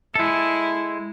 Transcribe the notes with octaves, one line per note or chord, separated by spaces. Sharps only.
G#3 E4 A4